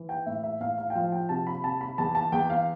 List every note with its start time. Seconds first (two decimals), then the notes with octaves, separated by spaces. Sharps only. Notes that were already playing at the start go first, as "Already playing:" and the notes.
Already playing: E3
0.09 G5
0.26 A2 E5
0.43 E5
0.60 A2 F5
0.78 F5
0.90 G5
0.95 F3 F5
1.12 G5
1.29 C3 A5
1.47 B5
1.64 C3 A5
1.81 B5
1.98 E2 A5
2.15 A5
2.32 E2 G5
2.50 F5